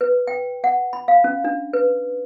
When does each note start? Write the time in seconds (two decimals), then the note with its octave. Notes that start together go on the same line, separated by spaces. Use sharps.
0.01 B4
0.27 G5
0.64 F#5
0.93 B5
1.08 F5
1.24 C#4
1.44 D4
1.73 B4